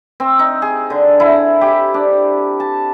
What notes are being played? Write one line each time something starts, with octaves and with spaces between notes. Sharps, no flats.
C4
D#4
G#4
D3
E4
G4
D4
A5